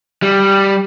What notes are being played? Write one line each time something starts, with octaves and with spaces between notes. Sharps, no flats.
G3